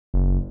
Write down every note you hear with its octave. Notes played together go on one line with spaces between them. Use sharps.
F#1